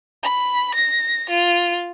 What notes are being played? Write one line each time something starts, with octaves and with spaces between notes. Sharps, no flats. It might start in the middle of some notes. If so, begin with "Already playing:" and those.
B5
A#6
F4